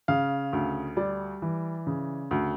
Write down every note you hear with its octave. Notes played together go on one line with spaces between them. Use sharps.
C#3 F5
D2
G3 D5
E3
C#3
D2